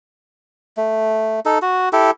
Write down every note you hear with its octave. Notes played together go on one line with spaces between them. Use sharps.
A3
D#4 A4
F#4
E4 G4 A4